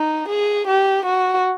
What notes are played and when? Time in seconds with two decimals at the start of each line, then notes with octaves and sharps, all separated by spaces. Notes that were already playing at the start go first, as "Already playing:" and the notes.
Already playing: D#4
0.28 G#4
0.67 G4
1.05 F#4